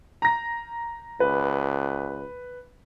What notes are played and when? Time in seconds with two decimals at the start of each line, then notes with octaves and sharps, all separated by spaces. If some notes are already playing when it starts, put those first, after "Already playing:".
0.22 A#5 A#6
1.20 C#2 B4